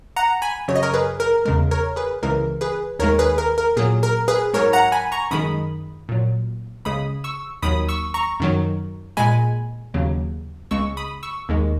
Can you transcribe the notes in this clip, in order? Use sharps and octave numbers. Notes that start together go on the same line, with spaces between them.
F#5 A#5
G#5 B5
F#2 C#3 F#3 C#5
D#5
A#4 C#5
G#4 B4
A#4
E2 C#3 G#3 A#4
A#4 C#5
G#4 B4
C#2 C#3 E3 G#3 A#4
G#4 B4
D#2 D#3 G#3 A#4 C#5
G#4 B4
A#4
A#4
A#2 F#3 G#4
A#4
G#4 B4
G#2 F#3 A#4 C#5
F#5 A#5
G#5 B5
A#5 C#6
F#2 D#3 G#3 B5 D#6
A#2 F#3
C#2 C#3 G#3 B5 D#6
C#6 E6
D#2 D#3 F#3 B5 D#6
C#6 E6
A#5 C#6
F#2 D#3 F#3
A#2 G#3 G#5 B5
D#2 C#3 F#3
C#2 C#3 G#3 C#6 E6
B5 D#6
C#6 E6
D#2 D#3 G#3